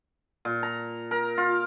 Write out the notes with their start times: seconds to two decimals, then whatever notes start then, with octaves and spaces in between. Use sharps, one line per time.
0.45 A#2
0.63 A#5
1.11 A#4
1.38 F4